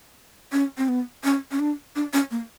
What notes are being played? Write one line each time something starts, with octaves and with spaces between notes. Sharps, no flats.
C#4
C4
B3
C#4
C#4
D4
D4
C#4
A#3